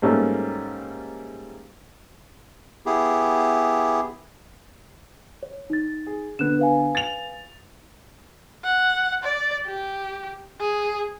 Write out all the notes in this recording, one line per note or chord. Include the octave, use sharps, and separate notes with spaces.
G#2 G3 A3 A#3 C#4
B3 E4 G4 G#4
C#5
D#4 A6
G#4
D3 B3 F#6 E7
B4 F5 G#5
A6 F7
F#5
D5
G4
G#4